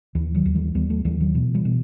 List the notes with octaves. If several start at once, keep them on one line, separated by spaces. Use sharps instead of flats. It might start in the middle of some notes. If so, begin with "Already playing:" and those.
D#2 E3
D#3 F#3
D#2
E3 G3
D#2 G3 B3
F#3 A3
D#2 E3 G3
D#3 F#3
B2 E3
E3 G3
B2